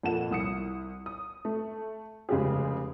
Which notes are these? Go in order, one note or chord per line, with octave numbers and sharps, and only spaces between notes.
F2 A#2 A4 F#5 E7
C2 D#6 C#7
D#6
A3
F1 C#3 G#3 G4 G#4